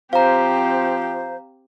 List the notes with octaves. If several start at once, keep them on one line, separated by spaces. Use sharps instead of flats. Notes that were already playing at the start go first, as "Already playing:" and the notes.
F3 C4 G4 C5 F5 A#5